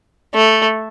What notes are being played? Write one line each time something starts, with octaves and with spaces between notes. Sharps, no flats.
A3